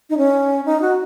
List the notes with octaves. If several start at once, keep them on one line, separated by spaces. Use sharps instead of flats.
D#4
C#4
D#4
F#4